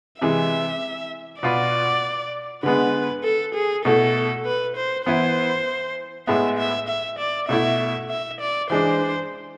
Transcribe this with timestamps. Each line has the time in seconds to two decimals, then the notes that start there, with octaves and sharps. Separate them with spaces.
0.20 C3 E3 G#3 E5
1.42 B2 B3 F4 B4 D5
2.63 D3 G#3 B3 B4
3.24 A4
3.55 G#4
3.85 B2 A3 E4 A4
4.45 B4
4.76 C5
5.06 E3 B3 E4 B4 C5
6.27 A2 G#3 B3 E5
6.58 E5
6.88 E5
7.19 D5
7.49 B2 A3 E4 E5
8.10 E5
8.41 D5
8.70 E3 G#3 D4 C5